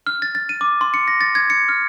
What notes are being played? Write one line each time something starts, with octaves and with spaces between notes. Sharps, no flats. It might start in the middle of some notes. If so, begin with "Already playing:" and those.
F6
A6
A6
D#7
D6
C6
C#7
A#6
A6
G#6
C#7
F6